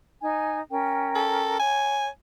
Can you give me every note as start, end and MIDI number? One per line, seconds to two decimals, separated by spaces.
0.21 0.59 63
0.21 0.59 80
0.72 1.57 61
0.72 1.57 70
0.72 1.57 79
1.15 1.59 69
1.60 2.09 73
1.60 2.08 80